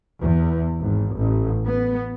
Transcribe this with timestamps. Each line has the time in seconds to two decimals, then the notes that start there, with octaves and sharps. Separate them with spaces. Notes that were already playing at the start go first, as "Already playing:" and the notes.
0.20 E2
0.80 G#1
1.16 A1
1.67 B3